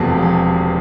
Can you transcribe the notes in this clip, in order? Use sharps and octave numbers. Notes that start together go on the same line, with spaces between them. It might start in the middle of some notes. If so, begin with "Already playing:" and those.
Already playing: E1 E2 C3 F3 A3 A5
G#5